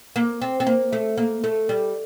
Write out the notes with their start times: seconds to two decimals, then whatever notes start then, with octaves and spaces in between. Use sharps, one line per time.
0.16 A#3
0.42 C4
0.60 C4
0.67 A#3
0.93 A3
1.18 A#3
1.44 A3
1.69 G3